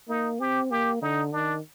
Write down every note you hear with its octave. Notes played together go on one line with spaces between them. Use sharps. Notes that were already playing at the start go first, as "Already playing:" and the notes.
A#3 D#4
C4 G4
A#3 G4
D3 D#4
D#3 D4